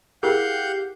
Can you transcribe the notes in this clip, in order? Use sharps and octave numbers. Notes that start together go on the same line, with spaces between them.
E4 G4 G#4 A#4 F5 F#5 G6